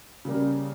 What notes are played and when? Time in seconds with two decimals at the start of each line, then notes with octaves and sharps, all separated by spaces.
0.25 C#3 G3 A#3